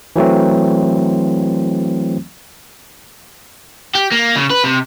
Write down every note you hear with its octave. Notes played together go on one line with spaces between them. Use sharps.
E3 F#3 A3 C4
G4
A#3
C#3
B4
C3